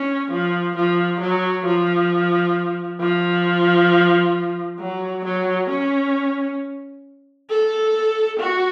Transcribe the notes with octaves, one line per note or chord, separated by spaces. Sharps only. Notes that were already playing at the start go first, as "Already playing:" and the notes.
Already playing: C#4
F3
F3
F#3
F3
F3
F#3
F#3
C#4
A4
F#4